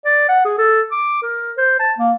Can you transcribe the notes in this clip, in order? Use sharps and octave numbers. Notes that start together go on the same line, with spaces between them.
D5
F#5
G#4
A4
D6
A#4
C5
A5
A#3